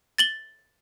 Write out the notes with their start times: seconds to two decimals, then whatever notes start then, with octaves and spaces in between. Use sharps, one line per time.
0.18 A6 F#7 G7